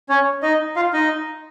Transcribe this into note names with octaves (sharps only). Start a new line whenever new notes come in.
C#4 C#5
D#4 D#5
F4 F5
D#4 D#5